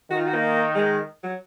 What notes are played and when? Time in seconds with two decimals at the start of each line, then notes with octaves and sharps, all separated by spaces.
0.10 D#3 F#4
0.18 F4
0.26 F#4
0.35 A#3
0.75 G#3
1.23 F#3